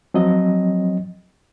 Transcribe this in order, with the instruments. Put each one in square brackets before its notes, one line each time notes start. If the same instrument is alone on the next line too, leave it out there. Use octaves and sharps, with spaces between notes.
[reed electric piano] F3 F#3 C4 D#5